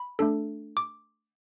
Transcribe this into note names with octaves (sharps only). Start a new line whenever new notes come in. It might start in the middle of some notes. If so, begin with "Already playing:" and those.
Already playing: B5
A3 D4 A4
D6